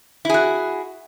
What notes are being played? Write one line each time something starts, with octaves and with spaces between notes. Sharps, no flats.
E4 F#4 G#4